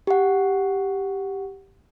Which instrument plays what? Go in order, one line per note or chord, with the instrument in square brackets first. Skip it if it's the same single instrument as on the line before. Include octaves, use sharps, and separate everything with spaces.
[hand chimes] G4 F#5